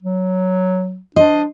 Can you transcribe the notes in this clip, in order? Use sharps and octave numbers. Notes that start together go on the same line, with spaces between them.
F#3
D4 C5 D#5